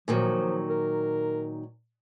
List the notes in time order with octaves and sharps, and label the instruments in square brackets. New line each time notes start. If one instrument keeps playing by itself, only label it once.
[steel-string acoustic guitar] A#2 D#3 F#3 [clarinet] F3
[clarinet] A#4